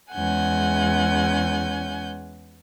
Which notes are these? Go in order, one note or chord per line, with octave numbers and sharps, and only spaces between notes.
E2 G#3 C#4 F#5 G#5 G6